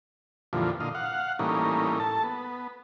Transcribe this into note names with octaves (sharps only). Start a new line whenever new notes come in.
F2 A#2 D3 E3 F3 G3
A#2 D3 D#5 F5
F5 F#5
A2 E3 G3 A#3 C#4 D#4
A4 A5
B3